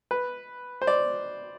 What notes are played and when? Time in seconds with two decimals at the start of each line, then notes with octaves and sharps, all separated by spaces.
0.11 B4
0.82 C5
0.87 D5